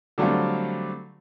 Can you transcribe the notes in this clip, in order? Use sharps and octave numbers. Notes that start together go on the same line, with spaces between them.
D3 F#3 G3 A3 C4 F4